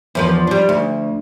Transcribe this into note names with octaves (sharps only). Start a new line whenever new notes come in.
E2 F3 B4
G3 D4
D2